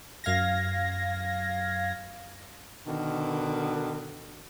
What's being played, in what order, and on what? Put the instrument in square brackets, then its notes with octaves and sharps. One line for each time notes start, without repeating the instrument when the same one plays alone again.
[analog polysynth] F#2 F5 G#6 A#6
[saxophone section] B2 D3 D#3